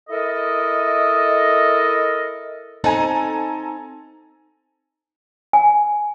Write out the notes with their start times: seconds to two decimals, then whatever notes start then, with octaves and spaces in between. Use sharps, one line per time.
0.09 E4 A4 A#4 D#5
2.84 C4 D#4 A4 F#5 G#5 A#5
5.53 G#5